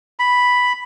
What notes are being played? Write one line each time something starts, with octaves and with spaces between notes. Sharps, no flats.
B5